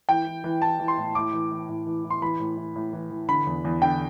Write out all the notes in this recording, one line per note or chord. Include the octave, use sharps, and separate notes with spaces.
E3 G5
E3
E3
E3 A5
E3
C6
A2
A2 D6
E3
E3
A2
E3
E3
C6
E3 B5
A2
E3
A2
E3
E3
D3 B5
E2
E2
D3 G5